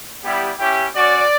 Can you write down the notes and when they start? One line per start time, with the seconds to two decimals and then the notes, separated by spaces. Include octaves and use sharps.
0.24 G3 B3 E4 G4
0.59 C#4 E4 G4
0.94 C#4 F#4 D5